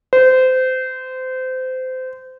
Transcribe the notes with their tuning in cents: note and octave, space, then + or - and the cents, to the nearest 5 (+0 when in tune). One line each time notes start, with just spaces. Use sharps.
C5 -25